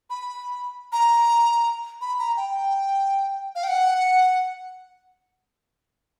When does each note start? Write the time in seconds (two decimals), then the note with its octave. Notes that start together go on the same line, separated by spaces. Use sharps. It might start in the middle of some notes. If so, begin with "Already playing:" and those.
0.10 B5
0.92 A#5
2.01 B5
2.19 A#5
2.37 G5
3.55 F5
3.64 G5
3.68 F#5